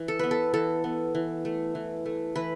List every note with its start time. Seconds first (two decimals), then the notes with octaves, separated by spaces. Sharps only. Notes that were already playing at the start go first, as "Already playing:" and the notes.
Already playing: E3
0.08 A4
0.19 B3 B4
0.31 A4
0.54 E3 A4
0.84 B3
1.15 E3
1.45 A3
1.75 E3
2.06 A3
2.36 E3 B4